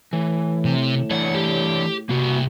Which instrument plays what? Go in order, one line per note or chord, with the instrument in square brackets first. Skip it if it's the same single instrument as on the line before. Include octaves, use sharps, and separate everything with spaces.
[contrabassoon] A2 [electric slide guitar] E3
[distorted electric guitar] C3
[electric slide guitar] E3 D4 C#5 [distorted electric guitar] F#5
[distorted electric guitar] G4
[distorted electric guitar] C2 [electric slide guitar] A#3 F#4